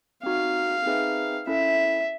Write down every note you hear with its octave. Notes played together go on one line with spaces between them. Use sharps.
C4 D#4 F#4 F5
C4 D#4 G#4 B4 E5
C#4 E4 A4 E5